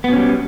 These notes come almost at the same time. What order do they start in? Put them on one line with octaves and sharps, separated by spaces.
B3 B2 C#4 G3